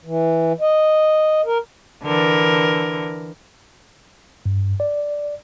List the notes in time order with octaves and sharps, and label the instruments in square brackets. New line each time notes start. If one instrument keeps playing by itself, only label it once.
[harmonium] E3
D#5
A#4
[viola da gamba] D3 E3 A#4
[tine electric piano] G2
D5